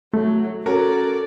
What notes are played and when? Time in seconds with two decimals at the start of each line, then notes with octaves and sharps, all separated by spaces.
0.13 F#3 A3
0.66 C#4 F#4 A4 A#4 D5